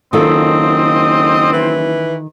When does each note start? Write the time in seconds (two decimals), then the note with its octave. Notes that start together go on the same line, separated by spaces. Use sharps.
0.13 F#1 D#3 C4 F4 A4 D#5
1.53 E3